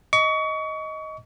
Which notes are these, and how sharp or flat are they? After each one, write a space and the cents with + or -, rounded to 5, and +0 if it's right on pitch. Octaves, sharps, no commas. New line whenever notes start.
D#5 +10 C#6 +30